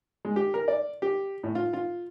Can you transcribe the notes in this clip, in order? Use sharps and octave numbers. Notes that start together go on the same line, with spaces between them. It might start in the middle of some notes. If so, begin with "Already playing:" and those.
G#3
G4
A#4
D5
G4
A2
F4
F4